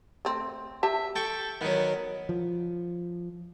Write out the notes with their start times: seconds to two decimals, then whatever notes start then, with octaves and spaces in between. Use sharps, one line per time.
0.25 A3 C4
0.83 G4 E5 A5
1.16 A4 G5 C#6
1.61 D#3 F#3 B3
2.29 F3